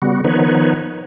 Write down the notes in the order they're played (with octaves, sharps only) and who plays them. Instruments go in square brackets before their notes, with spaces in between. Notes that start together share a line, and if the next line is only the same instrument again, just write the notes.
[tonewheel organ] C#3 G3 B3 F#4
D#3 F3 B3 D#4 B4 C#5